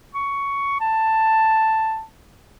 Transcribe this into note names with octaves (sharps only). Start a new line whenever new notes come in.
C#6
A5